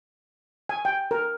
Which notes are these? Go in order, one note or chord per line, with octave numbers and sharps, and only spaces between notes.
G#5
G5
A#4